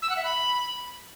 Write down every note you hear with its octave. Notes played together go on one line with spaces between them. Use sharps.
E6
F#5
E5
B5